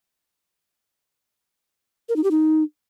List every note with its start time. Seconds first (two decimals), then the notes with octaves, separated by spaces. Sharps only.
2.09 A#4
2.16 D#4
2.24 G4
2.31 D#4